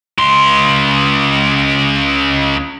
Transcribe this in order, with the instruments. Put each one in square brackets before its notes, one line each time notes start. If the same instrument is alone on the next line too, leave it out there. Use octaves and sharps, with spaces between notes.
[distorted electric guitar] C#2 C6